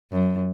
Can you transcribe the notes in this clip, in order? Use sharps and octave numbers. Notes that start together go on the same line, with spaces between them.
F#2